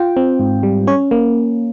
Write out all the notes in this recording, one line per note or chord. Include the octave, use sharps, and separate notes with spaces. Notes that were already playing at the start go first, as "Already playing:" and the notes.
Already playing: F4 G5
C4
G#2
G3
C#4 C#5
A#3